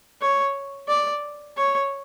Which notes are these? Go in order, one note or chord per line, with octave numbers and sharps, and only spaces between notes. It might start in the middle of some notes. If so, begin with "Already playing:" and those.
C#5
D5
C#5